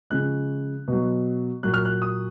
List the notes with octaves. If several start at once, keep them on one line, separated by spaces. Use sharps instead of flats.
C#3 F3 G#3 F#6
B2 F#3
A#2 F#3 F#6
F6
F#6
D#6